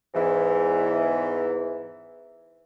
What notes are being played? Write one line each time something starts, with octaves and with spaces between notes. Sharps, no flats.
E2 G#2 E3